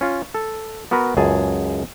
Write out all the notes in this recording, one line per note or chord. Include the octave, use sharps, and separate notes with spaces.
C#4 F4
A4
B3 F#4 A#4 B4
C#2 F#2 G#4 G#5 A5